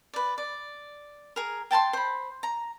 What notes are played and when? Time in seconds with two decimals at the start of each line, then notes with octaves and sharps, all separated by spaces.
0.14 B4 D5
0.38 D5
1.36 G#4 A#4
1.71 G5 A5 A#5 C6
1.93 C5 B5
2.43 A#5